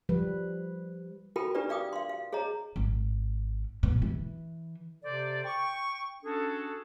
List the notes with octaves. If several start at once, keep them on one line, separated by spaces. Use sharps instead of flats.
F3 G3 B4
F4 F#4 A4 A#4 G5 B5
D4 F4 G4 B4 D5
D5 F5 G5 D6 D#6
F5 C6
F5
G#4 C#5 D#5 A#5
G#1
B2
E3
C3 A4 C5 D5
G5 C#6
C#4 D4 F#4 G#4 A4